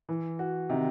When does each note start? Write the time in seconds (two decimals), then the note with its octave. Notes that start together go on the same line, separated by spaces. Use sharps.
0.09 E3
0.39 F#4
0.69 C3 D#3